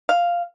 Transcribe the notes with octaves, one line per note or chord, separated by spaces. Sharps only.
F5